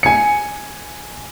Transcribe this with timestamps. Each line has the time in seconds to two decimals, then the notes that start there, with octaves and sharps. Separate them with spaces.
0.03 G#5 C#7